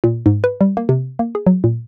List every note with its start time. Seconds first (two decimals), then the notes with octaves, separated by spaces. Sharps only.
0.04 A#2
0.26 G#2
0.44 B4
0.61 G3
0.77 A#3
0.89 C3
1.19 A#3
1.35 G#4
1.47 F#3
1.64 A#2